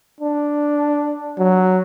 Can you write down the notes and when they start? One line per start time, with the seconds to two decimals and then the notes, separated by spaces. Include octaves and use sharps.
0.21 D4
1.39 F#3